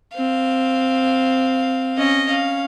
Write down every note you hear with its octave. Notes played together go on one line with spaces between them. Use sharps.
C4 F5
C#4 D#5
C#4 F5